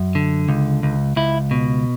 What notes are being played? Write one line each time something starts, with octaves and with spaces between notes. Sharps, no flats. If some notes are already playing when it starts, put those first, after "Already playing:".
Already playing: F#2
D3
C#2
C#2
C#2 E4
B2